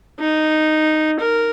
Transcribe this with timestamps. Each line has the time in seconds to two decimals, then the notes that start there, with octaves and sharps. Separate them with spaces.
0.20 D#4
1.20 A#4